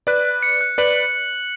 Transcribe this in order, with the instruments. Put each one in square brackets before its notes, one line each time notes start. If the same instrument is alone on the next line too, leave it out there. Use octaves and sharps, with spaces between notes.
[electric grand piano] B4 D5 [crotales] F#6
[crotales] F#6
C#7
F#6
[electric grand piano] B4 D5 [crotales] F#7